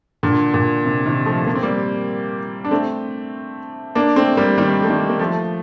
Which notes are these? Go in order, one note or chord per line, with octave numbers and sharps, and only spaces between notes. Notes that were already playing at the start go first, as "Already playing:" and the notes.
A#2 D3
A#2
C3
C3 D#3
F3 A3
A#3
C4
G3 A#3
D4
A3 C4
A#3 D4
A3 C4
G3 A#3
D#3 G3
A3
D#3 G3
A#3
F3 A3